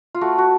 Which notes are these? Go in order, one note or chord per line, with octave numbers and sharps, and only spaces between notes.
F4
A3 F#4
F#4